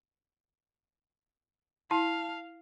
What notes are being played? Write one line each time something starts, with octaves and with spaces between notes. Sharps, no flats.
E4 F5 A5